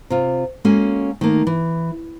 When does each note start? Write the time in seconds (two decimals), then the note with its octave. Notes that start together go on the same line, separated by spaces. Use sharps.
0.10 C3 F4
0.65 G#3 A#3 C#4 F#4 A4 G#5
1.21 D#3 A3 A#3
1.47 E3